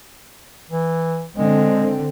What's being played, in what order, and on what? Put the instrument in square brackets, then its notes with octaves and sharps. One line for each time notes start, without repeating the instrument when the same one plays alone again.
[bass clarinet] E3
[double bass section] D3 C4 [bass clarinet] G#3